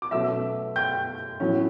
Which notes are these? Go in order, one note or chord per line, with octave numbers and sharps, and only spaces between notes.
D6
B2 F#3 A3 C#4 E5 E6
G5 G6
A2 F#3 C#4